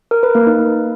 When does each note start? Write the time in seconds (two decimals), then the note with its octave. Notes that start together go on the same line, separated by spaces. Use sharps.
0.11 A#4
0.23 B4
0.35 A#3
0.47 D#4